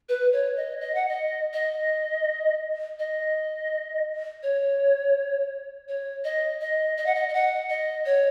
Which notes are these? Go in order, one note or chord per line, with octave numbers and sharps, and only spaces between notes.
B4
C#5
D#5
D#5
F#5
D#5
D#5
D#5
C#5
C#5
D#5
D#5
D#5
F#5
D#5
D#5
F#5
D#5
C#5